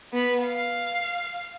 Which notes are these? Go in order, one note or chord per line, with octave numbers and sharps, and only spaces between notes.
B3 B5
F5